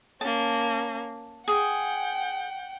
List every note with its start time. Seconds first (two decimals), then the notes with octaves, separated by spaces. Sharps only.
0.21 A#3 C#4 A5
1.48 G#4 F#5 G5